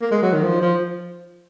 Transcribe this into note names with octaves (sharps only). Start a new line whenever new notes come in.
A#3
G#3
F#3
D#3
F3
F3